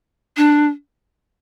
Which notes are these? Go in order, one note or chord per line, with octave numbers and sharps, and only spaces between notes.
D4